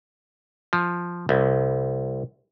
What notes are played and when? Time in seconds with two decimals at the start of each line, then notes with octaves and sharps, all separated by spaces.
0.73 F3
1.29 C2